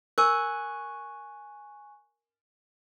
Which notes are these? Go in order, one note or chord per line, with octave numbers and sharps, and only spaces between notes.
A#4 G#5 C#6 F#6